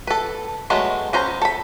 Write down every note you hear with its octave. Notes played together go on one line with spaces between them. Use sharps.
A4 B4
F#3 G#3 A3 B3
B3 C#4 C5 A#5
A4 B5